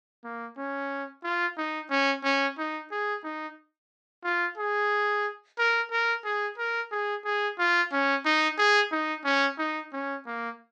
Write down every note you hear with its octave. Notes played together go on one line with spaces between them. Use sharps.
A#3
C#4
F4
D#4
C#4
C#4
D#4
G#4
D#4
F4
G#4
A#4
A#4
G#4
A#4
G#4
G#4
F4
C#4
D#4
G#4
D#4
C#4
D#4
C#4
A#3